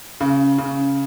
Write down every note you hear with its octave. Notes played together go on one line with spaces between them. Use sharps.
C#3
C#3